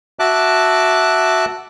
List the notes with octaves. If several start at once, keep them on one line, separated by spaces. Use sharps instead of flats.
F#4 E5 A5 D6 F#6